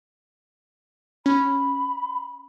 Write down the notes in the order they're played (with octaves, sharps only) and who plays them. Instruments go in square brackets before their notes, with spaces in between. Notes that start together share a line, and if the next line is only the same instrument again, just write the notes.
[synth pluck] C#4 [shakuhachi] B5